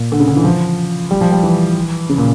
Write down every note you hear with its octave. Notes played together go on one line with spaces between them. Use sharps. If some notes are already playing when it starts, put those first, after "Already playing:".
Already playing: A#2
D3
C#3
D3
E3
F3
G3
F3
G3
E3
C#3
A#2